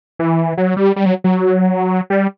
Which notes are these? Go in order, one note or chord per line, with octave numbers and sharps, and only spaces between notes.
E3
F#3
G3
G3
F#3
F#3
G3